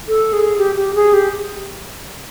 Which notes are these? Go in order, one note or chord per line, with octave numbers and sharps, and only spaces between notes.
A4
G#4
G4
G4
G#4
G4